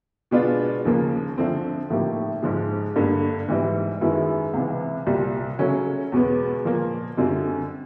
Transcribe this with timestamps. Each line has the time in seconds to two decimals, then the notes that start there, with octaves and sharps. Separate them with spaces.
0.31 B2 G#3 B3 D4 F4
0.85 D#2 C#3 F3 A#3
1.38 D3 F3 A3 C4
1.90 A2 F3 A#3 D#4 G4
2.43 G#2 F3 G#3
2.96 G2 D3 G3 A#3
3.49 G#2 E3 G3
4.01 F#2 D#3 G#3 B3 E4
4.54 C#2 C3 E3
5.07 C2 A#2 G3
5.59 C#3 F#3 A3 C#4
6.12 E2 B2 G#3 B3
6.65 A#2 F3 A#3
7.17 F#2 D3 G3 C4 F4